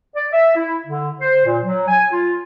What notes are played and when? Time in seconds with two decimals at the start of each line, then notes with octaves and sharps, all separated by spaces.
0.16 D5
0.33 E5
0.56 E4
0.87 D3
1.20 C5
1.46 A#2
1.64 F#3
1.88 G#5
2.12 F4